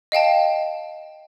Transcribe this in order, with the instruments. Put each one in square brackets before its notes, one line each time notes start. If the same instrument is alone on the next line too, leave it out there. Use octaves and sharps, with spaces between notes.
[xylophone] D#5 F5 G5 A5